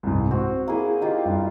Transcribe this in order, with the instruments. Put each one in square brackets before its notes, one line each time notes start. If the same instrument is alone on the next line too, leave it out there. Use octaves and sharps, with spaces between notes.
[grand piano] C2 G#2
[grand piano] C4 [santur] F#4
[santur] A#3 E4 G#4
D#4 F4 G4
[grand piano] G2